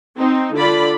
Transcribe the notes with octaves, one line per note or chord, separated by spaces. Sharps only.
C4 D#4
D3 F4 D5 B5